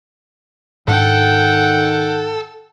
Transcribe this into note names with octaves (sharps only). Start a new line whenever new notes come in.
G#2 D#3 D4 A4 F#5 G5